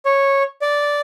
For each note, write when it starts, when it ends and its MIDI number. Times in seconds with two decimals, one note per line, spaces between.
0.05 0.43 73
0.61 1.01 74